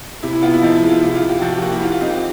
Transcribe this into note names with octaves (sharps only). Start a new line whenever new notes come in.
C3 E4
E4
B3 F4
E4
F3 D#4
E4
G#3
F4
C3 E4
F4
C3
G4
F3 F#4
G4
A#3 F#4
E4
G#2 F4
F4
C4 D#4
G4